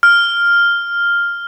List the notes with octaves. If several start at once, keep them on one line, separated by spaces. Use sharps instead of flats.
F6